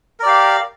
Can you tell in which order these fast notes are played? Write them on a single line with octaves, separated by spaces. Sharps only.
A#4 D5 G4 F5